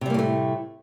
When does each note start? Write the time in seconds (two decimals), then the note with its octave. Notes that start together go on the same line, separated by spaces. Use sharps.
0.01 C3
0.06 G3
0.10 A#3
0.14 A2
0.19 A3